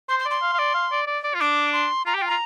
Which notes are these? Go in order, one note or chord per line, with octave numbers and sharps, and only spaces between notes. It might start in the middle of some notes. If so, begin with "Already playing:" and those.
C5 C6
C6
D5
C6
F5
F5
D5
F5
D5
D5
D5
F4
D4 D6
C6
F4 A#5
G4
F4 G5
F4 A#5